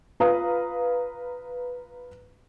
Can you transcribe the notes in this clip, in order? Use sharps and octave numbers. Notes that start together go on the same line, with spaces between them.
F4 B4 F5 A#5 D#6